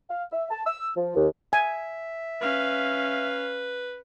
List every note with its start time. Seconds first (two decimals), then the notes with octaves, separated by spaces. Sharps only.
0.10 F5
0.32 E5
0.51 A5
0.66 E6
0.96 F3
1.14 D#2
1.53 E5 G#5
2.41 C#4 B4 F5